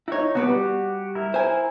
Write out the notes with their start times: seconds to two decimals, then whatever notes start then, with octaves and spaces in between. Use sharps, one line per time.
0.08 D#4 E4 C#5
0.35 B2 B3 F#4 G4 B4
0.49 G3
1.15 E4 A#4
1.34 C5 G#5